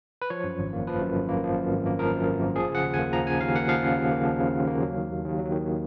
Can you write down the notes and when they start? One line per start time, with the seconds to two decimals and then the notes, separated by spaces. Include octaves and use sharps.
0.22 B4
0.30 F3 C#5
0.44 F#2
0.59 G#1
0.73 A#3
0.87 F3 B4
1.01 F#2
1.15 G#1
1.29 A#3
1.44 F3
1.58 F#2
1.72 G#1
1.86 A#3
1.99 F3 A#4
2.14 F#2
2.28 G#1
2.42 A#3
2.56 F3 G#4
2.70 C#3 F#5
2.84 D#2
2.94 G#5
2.99 A#3
3.13 F3 A#5
3.26 C#3 G#5
3.41 D#2 F5
3.55 A#3 F#5
3.69 F3 F5
3.83 C#3
3.97 D#2
4.11 A#3
4.25 F3
4.40 C#3
4.54 D#2
4.67 A#3
4.82 F#3
4.97 D#3
5.10 D#2
5.25 D#2
5.39 F#3
5.52 D#3